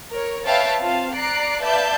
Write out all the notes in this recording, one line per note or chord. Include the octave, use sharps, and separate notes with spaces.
A#4 C#5
B4 C#5 E5 F5 G5 A5
C4 F4 F5 A5
D5 A#5 F#6 C7 D7
B4 D5 E5 F5 A5 G6